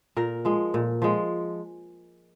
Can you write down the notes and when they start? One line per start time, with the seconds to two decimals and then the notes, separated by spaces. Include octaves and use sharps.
0.16 A#2 A#4
0.45 F3 G#3
0.74 A#2
1.02 F3 G#3